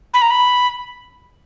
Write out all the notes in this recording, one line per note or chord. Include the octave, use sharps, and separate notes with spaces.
B5
A#5
B5